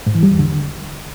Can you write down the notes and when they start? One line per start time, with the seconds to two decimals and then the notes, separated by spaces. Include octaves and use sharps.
0.07 G#2
0.15 E3
0.23 G3
0.31 E2
0.39 D3